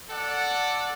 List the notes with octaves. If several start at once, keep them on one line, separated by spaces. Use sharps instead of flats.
A4 D5 F#5